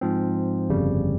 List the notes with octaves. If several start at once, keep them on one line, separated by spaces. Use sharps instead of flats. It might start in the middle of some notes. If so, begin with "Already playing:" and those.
G#2 F3 C4
G1 F2 C#3 G3